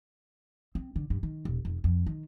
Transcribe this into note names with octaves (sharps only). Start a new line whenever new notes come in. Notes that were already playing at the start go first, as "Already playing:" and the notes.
C4
D3
G2
D#3
D#1
F1
F2
D#3